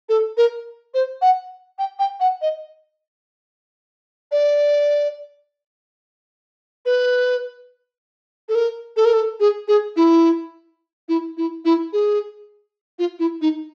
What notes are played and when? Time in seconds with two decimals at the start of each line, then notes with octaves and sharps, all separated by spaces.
0.09 A4
0.37 A#4
0.94 C5
1.22 F#5
1.79 G5
1.99 G5
2.20 F#5
2.42 D#5
4.32 D5
6.86 B4
8.49 A4
8.55 A#4
8.96 A4
9.05 A#4
9.13 A4
9.40 G#4
9.68 G#4
9.96 E4
11.08 E4
11.37 E4
11.65 E4
11.93 G#4
12.99 F4
13.19 E4
13.41 D#4